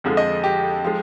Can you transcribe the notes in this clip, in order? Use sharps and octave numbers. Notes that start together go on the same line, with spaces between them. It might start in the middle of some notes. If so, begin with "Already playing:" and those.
F2 D3 F3 G#3
D#5
G4
F3 G#3